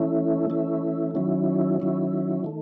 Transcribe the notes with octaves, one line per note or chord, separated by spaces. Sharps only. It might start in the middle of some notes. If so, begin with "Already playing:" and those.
Already playing: E3 A3 C#4 E4
E3 A3 C#4 E4
D#3 F#3 C#4 E4
D#3 F#3 C#4 E4
D#3 A3